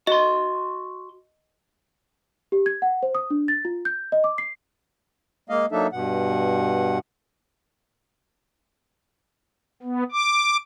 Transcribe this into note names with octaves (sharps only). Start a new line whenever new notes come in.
F#4 D#5 C6
G4
G#6
F#5
C5
D#6
D4
A6
F4
G6
D#5
D6
C7
G#3 A#3 D#5 F5
F#3 A#3 D4 D#4 A4 E5
G2 B2 F#5
B3
D6